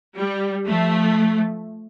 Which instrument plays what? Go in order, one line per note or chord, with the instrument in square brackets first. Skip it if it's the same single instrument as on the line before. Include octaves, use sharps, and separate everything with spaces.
[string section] G3
F3 A3